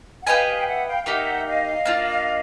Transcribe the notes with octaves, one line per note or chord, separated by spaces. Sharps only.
F#5
G4 B4 D#5 F5 G5 G#5
F5 G5
G5
E5 F#5
F5 G5
F5
A#3 D#4 G4 E5 F#5
D#5 F5
A#3 D4 F4